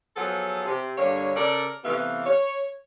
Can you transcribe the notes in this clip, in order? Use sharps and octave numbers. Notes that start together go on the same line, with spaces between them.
F3 F#3 B3 G#4 A4
C3
G2 D3 A#3 C#5
C#3 A4 A#4 D5
C3 E3 A3 B3 F5
C#5